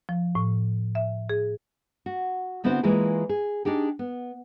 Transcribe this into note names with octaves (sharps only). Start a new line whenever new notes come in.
F3
A2
E5
G#4
F#4
D3 B3 C4 E4 F#4 C5
E3 G#3 A#3 E4 F4 G#4
G#4
D4 D#4 G4 G#4
B3